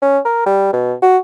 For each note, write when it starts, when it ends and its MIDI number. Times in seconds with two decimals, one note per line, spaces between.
0.02 0.19 61
0.25 0.42 70
0.46 0.70 55
0.73 0.94 47
1.02 1.18 66